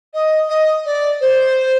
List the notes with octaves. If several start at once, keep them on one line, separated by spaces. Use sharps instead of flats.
D#5
D#5
D5
C5